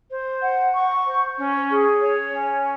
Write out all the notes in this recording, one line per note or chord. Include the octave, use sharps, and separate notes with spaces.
C5
F#5
C#6
C5
C#4
G#4
C#5
C#4